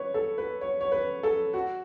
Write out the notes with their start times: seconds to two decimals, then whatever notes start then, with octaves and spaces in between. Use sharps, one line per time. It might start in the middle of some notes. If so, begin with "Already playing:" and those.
Already playing: B4 C#5
0.14 A4
0.38 B4
0.61 C#5
0.81 C#5
0.92 B4
1.23 A4
1.54 F#4